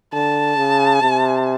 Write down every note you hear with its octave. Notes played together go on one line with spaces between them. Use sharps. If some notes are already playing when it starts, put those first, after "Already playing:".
D3 A5
C#3
C3